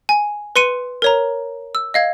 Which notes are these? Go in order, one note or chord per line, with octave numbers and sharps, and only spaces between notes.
G#5
B4 C6 C#7 D#7
A#4 C#5 A#5
E6
D#5 F5 G#6